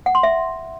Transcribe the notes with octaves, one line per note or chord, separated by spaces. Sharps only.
F#5
C6
E5